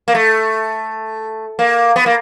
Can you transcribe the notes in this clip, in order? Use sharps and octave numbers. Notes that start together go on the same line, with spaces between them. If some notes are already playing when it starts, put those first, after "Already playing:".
A#3
A3
A#3
B3
A#3